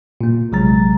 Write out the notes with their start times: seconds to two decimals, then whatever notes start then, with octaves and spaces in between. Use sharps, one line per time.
0.21 A#2 A#3
0.52 A#1 C3 F#3 G#3 A#5 A6